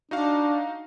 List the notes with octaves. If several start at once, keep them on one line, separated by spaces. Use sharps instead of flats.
D4 D#4 F#4 F5